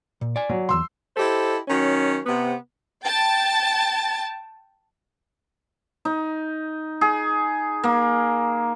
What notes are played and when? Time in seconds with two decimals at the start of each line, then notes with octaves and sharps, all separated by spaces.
0.21 A#2
0.36 D5 G#5
0.50 F#3
0.69 B1 E2 C6 E6
1.17 E4 G4 A4 C5 D#5
1.68 D#3 F#3 C#4
2.26 C3 B3
3.05 G5 A5 A6
6.05 D#4
7.01 G#4
7.83 A#3